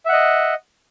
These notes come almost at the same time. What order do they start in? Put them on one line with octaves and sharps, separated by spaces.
E5 F#5 D#5